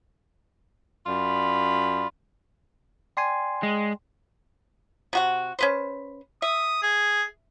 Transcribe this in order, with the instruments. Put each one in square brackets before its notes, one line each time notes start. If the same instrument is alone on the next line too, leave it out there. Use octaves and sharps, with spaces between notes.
[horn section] F#2 F4 D5 B5
[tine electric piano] D5 G#5 [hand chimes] G5 C6 C7
[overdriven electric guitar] G#3
[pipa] C3 F#4 F#5
C#4 B4 C5
[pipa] E5 [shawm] D#6
[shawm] G#4